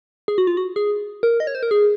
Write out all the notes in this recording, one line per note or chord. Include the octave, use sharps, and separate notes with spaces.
G#4
F#4
F4
F#4
G#4
A#4
D#5
C#5
C5
A#4
G#4